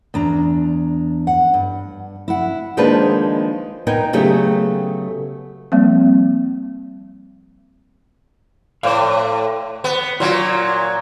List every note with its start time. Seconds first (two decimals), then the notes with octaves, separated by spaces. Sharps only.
0.14 E2 D4 A#5
1.27 F#5
1.54 G2
2.28 E4 F#5
2.77 D#3 F3 G#3 A#3 D4 B4
3.87 B3 D#4 A#4 G5 G#5
4.13 C#3 F#3 A3 B3 G4 G#4
5.72 F3 G3 A#3 C4
8.83 A2 C5 D5 F5
9.84 B3
10.20 A#2 F#3 F4